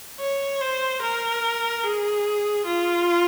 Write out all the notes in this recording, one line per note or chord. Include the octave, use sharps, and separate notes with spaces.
C#5
C5
A#4
G#4
F4